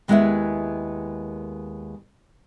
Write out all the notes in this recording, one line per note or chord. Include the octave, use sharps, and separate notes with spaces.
D#2 G#3 B3 E4 G#4 E5